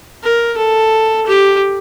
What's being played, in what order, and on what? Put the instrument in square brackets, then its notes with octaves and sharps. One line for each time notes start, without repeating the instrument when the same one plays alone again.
[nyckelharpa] A#4
A4
G4